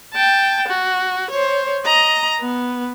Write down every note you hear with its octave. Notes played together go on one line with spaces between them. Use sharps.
G5 A5
F#4
C5 C#5
D#5 A#5
B3